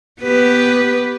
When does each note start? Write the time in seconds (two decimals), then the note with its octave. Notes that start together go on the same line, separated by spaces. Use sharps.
0.22 B3 G4 B4